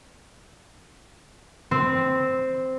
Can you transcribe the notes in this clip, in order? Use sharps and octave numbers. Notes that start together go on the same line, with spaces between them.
C4